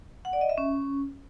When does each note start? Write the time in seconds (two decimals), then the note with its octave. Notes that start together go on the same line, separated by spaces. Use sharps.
0.25 F#5
0.33 D5
0.41 D#5
0.49 E5
0.58 C#4